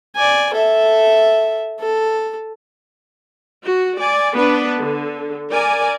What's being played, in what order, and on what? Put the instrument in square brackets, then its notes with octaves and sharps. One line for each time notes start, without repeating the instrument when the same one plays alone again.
[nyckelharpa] D5 G#5
A4 E5
A4
[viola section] F#4
D5 G#5
B3 D4 B4
D3
A#4 D5 G#5